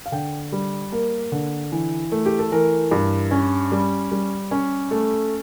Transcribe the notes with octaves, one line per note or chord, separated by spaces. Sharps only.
F5
D3 G5
G3
A#3 A#4
D3
E3
A3
G4
A4
E3 A#4
G2
C#4
G3
G3
C#4
A3 A4